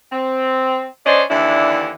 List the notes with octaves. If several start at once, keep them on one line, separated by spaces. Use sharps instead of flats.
C4
C#4 D4 C5 D5 D#5
D#2 D3 E3 D4 E4